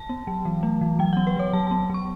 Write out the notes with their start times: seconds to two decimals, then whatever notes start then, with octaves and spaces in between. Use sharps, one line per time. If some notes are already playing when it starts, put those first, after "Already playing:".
Already playing: A5
0.09 B3
0.27 F#3
0.45 E3
0.63 A3
0.81 E3
0.99 F#3 G5
1.13 B3 F#5
1.27 B4
1.36 F#3 C#5
1.53 F#3 A5
1.67 B3 A5
1.90 F#3 C#6